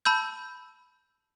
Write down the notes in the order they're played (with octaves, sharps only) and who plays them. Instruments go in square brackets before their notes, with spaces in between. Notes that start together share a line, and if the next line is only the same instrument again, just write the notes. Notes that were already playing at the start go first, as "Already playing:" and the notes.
[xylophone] A5 B5 E6 G6